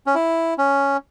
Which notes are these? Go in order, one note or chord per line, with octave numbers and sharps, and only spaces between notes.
C#4
E4
C#4